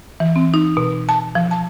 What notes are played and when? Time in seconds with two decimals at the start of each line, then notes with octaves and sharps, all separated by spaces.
0.20 E3
0.36 C4
0.54 D#4
0.77 B2
1.09 A5
1.35 F3
1.51 A5